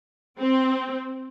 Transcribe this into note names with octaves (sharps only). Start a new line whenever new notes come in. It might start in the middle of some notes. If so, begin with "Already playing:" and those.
C4